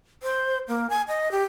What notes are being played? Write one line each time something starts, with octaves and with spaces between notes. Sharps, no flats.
C5
A#3
G#5
D#5
G4